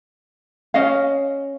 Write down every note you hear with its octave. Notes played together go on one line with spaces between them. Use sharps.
C#4 D#5 F5